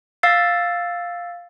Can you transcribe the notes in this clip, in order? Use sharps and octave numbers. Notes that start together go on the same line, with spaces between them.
F5 E6 A6 C7